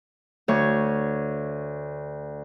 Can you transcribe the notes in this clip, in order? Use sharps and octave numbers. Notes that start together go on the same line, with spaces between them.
D2 C#5